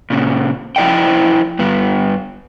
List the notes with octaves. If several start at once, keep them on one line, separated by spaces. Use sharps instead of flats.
A#2 C#3
F3 E4 D5 D#5 G5
G2 B3